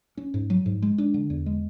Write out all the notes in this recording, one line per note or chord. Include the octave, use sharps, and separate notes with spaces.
C#4
G#2
F#3
G#2
G#3
D4
D3
E2
G#3